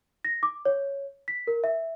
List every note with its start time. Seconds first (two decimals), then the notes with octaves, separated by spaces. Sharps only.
0.25 A#6
0.43 D6
0.65 C#5
1.28 B6
1.47 A#4
1.64 E5